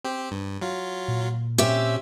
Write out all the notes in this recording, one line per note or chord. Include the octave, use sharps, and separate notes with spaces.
C4 G4
G2
F#3 F4
A#2
C4 C#4 G4 E5